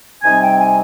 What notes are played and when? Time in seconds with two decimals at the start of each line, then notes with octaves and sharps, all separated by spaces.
0.22 C3 G3 C4 D#4 G#5
0.41 G5
0.58 G#5